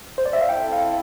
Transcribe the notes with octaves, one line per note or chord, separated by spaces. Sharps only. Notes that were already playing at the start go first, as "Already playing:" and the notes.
C5
D5
E5
F5
C4 E4 A4 G5
F5